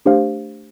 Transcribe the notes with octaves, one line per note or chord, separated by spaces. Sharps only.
A3 D4 G4 C5 F5